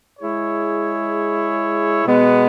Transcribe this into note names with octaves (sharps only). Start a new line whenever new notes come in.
G#3 E4 G#4 C#5
B2 G#3 B3